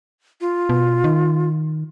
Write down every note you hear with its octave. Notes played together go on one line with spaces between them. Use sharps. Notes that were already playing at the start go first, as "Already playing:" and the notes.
F4
B2
D#3